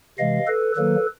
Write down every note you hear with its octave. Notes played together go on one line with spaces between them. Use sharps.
C3 E3 G#3 D#5 F5
A4 B4
D#3 F#3 A#3 A4 B4